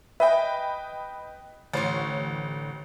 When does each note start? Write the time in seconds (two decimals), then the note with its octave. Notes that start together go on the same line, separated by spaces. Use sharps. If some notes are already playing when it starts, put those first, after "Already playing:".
0.20 B4 D#5 E5 G5 G#5
1.73 A1 D3 C5 C#5